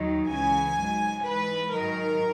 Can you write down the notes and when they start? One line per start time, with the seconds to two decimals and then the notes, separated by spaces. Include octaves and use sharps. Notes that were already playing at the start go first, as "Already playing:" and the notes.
Already playing: D#2 D#3 F#3
0.30 C#2 C#3 E3 G#5
0.77 G#2 F#3
1.25 G#2 E3 B4
1.72 G#2 D#3 F#3 A#4